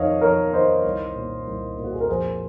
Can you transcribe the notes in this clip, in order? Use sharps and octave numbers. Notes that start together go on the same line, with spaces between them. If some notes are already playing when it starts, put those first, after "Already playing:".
Already playing: F2 D#3 C#5 D#5 F5
F2 A#4 C#5
D#3 C5 D#5
C2
A#2
C2
A#2
F#4
G#4
A#4
F2 G#4 C5